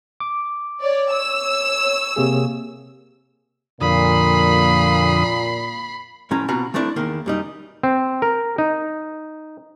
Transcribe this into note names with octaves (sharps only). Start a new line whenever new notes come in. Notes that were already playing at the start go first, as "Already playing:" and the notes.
D6
C#5 D5
C#5 E6
C3 A#3 G#4
F2 A#2 D3 B5 D#6 C7
A2 F3 C#4 A#5
B2 C4 F4 F#5 A#5 B5
F3 A3 C4 D4 E4
E2 D#3 A#3
F#2 G3 D#4
C4
A#4
D#4